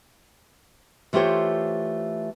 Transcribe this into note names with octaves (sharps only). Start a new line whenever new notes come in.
E3 A3 F4 G4 C5 C#5